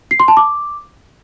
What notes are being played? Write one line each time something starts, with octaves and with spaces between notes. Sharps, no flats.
C7
C6
A5
D6